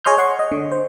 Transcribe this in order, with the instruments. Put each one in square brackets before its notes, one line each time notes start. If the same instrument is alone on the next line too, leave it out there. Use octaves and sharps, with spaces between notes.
[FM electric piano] G#4 C#5 D#5 C6 F6 G6
C#5 F#5 C6 C#6
D#5
D3
C5